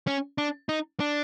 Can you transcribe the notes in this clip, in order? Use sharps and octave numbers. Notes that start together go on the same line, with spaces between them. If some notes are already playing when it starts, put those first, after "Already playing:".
C#4
D4
D#4
D4